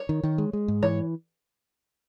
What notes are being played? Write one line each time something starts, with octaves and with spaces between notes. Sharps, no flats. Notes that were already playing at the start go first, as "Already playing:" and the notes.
Already playing: C#5
D#3
D#3
G#3
G#3
G#2
E3 C#5